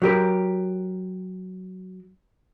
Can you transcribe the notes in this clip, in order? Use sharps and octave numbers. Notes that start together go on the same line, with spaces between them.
F#3 G4 A#4